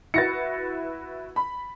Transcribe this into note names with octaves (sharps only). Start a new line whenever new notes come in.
E4 F#4 B4 A6 A#6 C#7
B5